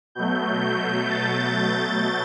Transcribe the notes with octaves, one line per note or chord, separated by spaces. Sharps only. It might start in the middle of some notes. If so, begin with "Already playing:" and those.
B2 F#3 A3 G6
G6
A6
A6